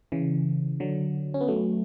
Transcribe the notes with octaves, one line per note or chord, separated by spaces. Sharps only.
C#3 E3
D3 F#3
C#4
B3
F#3 A3